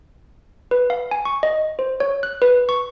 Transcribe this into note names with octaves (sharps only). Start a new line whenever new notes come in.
B4
F5
G#5
C#6
D#5
C5
C#5
F#6
B4
C#6